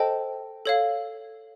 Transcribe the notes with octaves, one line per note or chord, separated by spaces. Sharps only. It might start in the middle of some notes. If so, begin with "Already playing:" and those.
Already playing: A4 C5 D#5 G5 A5
A4 C#5 F5